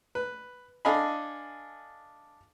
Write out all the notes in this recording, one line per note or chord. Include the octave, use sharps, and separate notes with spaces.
B4
D4 A4 D#5 F5 G#5 B5